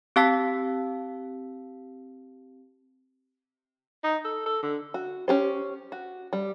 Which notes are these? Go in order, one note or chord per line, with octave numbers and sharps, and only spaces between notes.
C4 G4 F5 A5 E6 B6
D#4
A4
A4
D3
F#4
C#4 G4 C5
F#4
G3